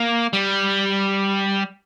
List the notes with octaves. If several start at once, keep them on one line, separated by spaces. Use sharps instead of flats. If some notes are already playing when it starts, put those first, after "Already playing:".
Already playing: A#3
G3